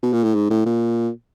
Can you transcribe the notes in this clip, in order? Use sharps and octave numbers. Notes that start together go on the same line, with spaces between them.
B2
A#2
A2
G#2
A2
A#2